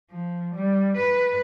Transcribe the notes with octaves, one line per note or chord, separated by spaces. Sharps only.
F3
G3
B4